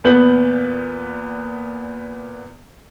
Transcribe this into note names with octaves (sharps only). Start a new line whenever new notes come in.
E2 A#2 B3 B4 G6 F#7